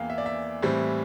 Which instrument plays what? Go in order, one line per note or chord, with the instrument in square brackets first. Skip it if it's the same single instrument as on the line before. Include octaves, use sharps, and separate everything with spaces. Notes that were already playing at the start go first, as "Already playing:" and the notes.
Already playing: [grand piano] E2 E3 A#3 F5 G5
E5
D5
E5
A2 E3 G3 C4